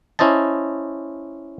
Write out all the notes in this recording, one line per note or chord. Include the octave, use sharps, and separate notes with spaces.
C#4 E4 C5 D#5 A5